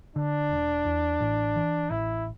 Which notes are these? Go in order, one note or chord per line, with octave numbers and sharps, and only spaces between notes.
D3 D4
E1
E2
A1
E3
A1 E4